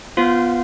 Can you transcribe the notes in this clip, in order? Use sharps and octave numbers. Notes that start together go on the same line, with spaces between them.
B3 F4 C5 F5